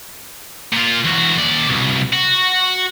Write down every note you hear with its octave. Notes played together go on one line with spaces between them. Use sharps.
A#2 F4
E2 F#4
D#2 D5
C2 B2
F#4